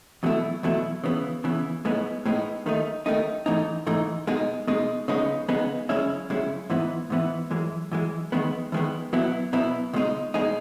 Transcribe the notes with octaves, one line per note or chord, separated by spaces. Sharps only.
E2 B2 F#3 A3 E4
E2 B2 F#3 A3 E4
C#3 E3 B3
C#3 E3 B3
A2 G#3 B3 D#4
A2 G#3 B3 D#4
D#2 D#3 A3 D#4
D#2 D#3 A3 D#4
G#2 E3 A3 D#4
G#2 E3 A3 D#4
B2 G#3 D#4
B2 G#3 D#4
C#3 G#3 B3 D#4
C#3 G#3 B3 D#4
F#2 C#3 G#3 C#4 E4
F#2 C#3 G#3 C#4 E4
G#2 E3 B3 E4
G#2 E3 B3 E4
F#2 E3 G#3
F#2 E3 G#3
E2 D#3 G#3 B3
E2 D#3 G#3 B3
B2 F#3 B3 E4
B2 F#3 B3 E4
C#2 B2 G#3 D#4
B2 G#3 D#4